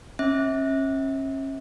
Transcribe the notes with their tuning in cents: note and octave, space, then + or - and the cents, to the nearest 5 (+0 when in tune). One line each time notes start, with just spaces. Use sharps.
C#4 -35 E5 -35